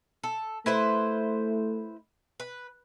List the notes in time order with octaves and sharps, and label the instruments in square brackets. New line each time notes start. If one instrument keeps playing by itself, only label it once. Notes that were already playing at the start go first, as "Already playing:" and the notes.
[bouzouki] A4
[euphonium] A3 [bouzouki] E4 B4 C5
[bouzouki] B4